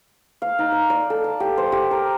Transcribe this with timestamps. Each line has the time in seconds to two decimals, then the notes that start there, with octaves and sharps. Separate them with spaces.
0.42 F5
0.59 D#4
0.72 D#5
0.90 D5
1.10 A4
1.24 A5
1.40 G4
1.57 C5
1.72 G4
1.91 A#4